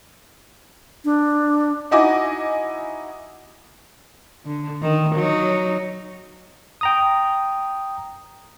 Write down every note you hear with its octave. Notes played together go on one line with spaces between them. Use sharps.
D4
D#4 E4 F#4 D#5 G#5 D6
D3
D#3
F#3 D#4
G5 A#5 D#6